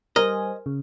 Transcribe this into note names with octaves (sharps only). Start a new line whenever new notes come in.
G3 A#4 C5 D#5 G#5 F6
C#3